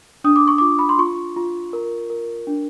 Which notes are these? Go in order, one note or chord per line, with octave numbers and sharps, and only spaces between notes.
D4 D#6
D6
C#6
F4 D6
B5
C6
F4 C#6
F4
A#4
A#4
D4